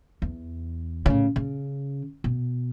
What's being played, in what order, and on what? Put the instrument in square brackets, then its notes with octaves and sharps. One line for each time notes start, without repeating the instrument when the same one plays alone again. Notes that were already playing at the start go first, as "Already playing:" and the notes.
[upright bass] E2
A2 C#3
C#3
B2